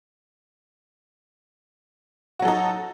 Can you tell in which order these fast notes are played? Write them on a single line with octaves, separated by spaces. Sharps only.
F#4 F#3 A4 D#4